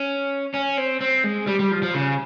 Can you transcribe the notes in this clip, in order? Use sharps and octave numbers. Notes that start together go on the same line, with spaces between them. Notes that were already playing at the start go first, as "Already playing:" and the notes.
Already playing: C#4
C#4
C4
C4
G#3
G3
G3
F3
F3
C#3